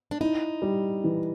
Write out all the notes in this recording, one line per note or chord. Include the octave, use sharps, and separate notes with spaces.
D4
D#4 E4
G3
E3